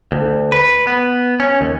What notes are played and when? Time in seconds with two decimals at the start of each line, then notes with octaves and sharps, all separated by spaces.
0.12 D2
0.52 B4
0.87 B3
1.40 C#4
1.61 D#2